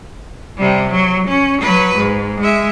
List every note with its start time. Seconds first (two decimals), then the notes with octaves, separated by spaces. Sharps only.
0.57 C3 G3
0.90 F#3
1.27 C#4
1.62 F#3 B4
1.97 G#2
2.41 G#3 E5